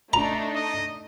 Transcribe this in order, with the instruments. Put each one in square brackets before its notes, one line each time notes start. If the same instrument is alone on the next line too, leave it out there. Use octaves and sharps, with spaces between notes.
[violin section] A3 D4 D#4 [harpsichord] A#5
[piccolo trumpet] D#5